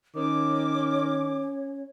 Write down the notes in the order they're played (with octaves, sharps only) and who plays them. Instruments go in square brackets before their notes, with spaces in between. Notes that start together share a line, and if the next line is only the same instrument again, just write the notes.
[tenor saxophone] D#3 [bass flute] C#4 [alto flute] C#5 [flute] D6